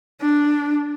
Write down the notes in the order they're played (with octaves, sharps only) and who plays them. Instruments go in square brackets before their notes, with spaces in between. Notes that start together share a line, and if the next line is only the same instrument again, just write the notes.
[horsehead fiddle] D4